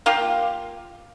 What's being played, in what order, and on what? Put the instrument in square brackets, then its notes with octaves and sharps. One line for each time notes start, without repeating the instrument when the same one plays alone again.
[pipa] A#3 F4 G4